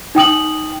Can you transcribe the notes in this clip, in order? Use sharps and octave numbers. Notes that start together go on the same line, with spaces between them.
D#4 G5 D#6 F#7